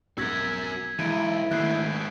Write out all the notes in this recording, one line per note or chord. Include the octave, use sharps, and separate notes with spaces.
B1 F2 G#2 F#4 A#4 E6 G#6 B6
B1 E3 G#3 E4 D7 D#7
G#2 B2 D#3 A3 F#6 G6 C7